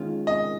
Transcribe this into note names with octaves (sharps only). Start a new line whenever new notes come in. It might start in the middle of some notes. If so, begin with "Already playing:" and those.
Already playing: D#3 G#3 C#4 F4
D#5